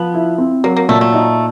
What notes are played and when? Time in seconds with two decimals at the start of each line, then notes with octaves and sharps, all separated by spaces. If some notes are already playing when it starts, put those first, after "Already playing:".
Already playing: F3 B3
0.14 E4
0.38 C4
0.64 F#3 A#3
0.77 A#3
0.89 A#2 A3
1.01 A3
1.14 D#4